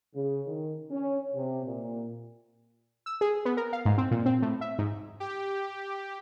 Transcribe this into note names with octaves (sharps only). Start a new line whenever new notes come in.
C#3
D#3
C#4
C3
A#2
E6
G#4
B3
A#4
F5
G#2
C4
A#2
C4
A2
E5
G#2
G4